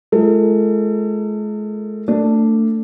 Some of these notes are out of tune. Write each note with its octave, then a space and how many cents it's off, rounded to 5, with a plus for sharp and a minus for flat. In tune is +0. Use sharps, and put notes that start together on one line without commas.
G#3 +40 F4 -35 A4 +40
A3 +30 D4 +0